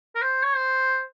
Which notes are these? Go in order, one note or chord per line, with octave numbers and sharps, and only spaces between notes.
A#4
C5
C#5
C5